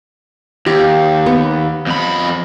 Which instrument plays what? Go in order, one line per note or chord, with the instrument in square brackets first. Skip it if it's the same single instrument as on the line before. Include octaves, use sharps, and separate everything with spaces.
[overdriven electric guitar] D#2 [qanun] G4
[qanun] B3
[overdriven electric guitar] F2 B5